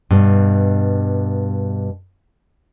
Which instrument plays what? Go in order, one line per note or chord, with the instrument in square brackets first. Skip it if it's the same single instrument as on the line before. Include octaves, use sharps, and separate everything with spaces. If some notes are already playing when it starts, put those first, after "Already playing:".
[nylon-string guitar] G2 B2